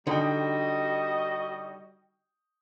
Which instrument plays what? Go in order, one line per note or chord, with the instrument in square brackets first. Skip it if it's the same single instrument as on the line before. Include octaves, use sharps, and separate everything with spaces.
[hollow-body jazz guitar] D3 [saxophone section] G3 F#4 D#5 [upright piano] D#4 G5